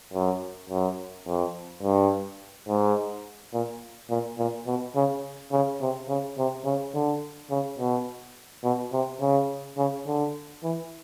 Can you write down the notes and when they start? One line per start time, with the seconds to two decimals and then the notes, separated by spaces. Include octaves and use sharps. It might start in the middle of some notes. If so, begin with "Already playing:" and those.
0.13 F#2
0.70 F#2
1.27 F2
1.83 G2
2.68 G#2
3.53 A#2
4.10 A#2
4.38 A#2
4.67 B2
4.95 C#3
5.52 C#3
5.81 C3
6.08 C#3
6.38 C3
6.65 C#3
6.94 D3
7.50 C#3
7.79 B2
8.64 B2
8.93 C3
9.21 C#3
9.77 C#3
10.07 D3
10.63 E3